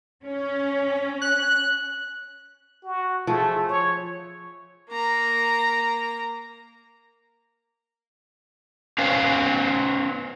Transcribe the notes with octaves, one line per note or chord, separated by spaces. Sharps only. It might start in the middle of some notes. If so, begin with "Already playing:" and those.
C#4
F#6
F#4
F3 A3 G#4
C#5
A#3 A#5
C#4 B4 C5 F5